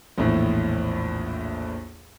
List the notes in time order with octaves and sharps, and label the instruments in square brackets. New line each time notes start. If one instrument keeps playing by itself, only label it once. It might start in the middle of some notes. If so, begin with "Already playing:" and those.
[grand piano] A#1 E2 A2